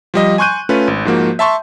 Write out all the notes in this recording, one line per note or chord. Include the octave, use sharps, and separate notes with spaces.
F3 G3 D#5
G#5 C6 C#6 F#6 G6 D#7
A3 C#4 F4 B4
G#1
G#2 F3 A#3 F#4
E5 A5 C6 C#6